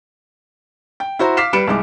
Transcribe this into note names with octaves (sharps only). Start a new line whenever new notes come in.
G5
E4 F#4 C5 A#5
F5 D6 F6 B6 C7 E7
G3 B4 C#7 D7 E7
C2 G#3 D6